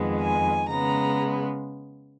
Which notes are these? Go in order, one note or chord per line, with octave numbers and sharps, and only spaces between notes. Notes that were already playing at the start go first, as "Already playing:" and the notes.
Already playing: F2 D#3 G#3 B3
G#5
C#3 G#3 B3 A#5